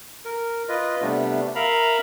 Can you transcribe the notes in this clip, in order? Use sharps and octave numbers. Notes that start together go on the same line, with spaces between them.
A#4
F4 B4 D#5
C3 G3 A3 B3 D4
A#4 E5 F5 A#5 B5